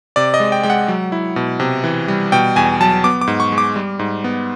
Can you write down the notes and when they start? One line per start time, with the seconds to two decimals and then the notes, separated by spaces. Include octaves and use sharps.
0.16 C3 D5
0.34 D#5
0.40 G#3
0.52 G5
0.63 G#3 G5
0.70 F#5
0.88 F#3
1.12 E4
1.36 B2
1.60 C3
1.84 E3
2.08 G3
2.32 B2 G5
2.56 E2 G#5
2.81 F#3 A5
3.04 B3 D6
3.21 D6
3.27 G#2
3.40 C#6
3.52 G#3
3.58 D6
3.76 G3
3.99 G#2
4.24 B3